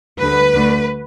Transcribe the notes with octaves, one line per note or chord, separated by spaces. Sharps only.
D2 D3 G3 B4
D2 D3 A3